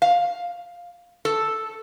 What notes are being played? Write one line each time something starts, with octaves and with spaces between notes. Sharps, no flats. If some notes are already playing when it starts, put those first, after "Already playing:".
F5
A4